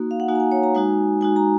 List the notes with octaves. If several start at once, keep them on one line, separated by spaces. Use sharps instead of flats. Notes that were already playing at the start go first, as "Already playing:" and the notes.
Already playing: A#3 D#4 F#4
F5
F#5
A#3 D#4 F#4 G#5
A#5
G#5
C#5
A#5
G#3 D#4 F#4 G#5
G#3 D#4 F#4 G#5
A#5